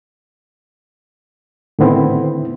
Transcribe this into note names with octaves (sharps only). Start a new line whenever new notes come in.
A2 D3 D#3 B3 C4 E4